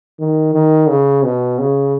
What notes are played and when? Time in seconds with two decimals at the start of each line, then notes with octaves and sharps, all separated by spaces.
0.19 D#3
0.54 D#3
0.89 C#3
1.23 B2
1.59 C#3